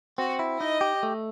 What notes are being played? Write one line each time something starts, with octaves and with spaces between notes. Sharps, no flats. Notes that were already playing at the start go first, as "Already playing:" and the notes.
C4 F#4
E4
D#4 D#5
G4
A3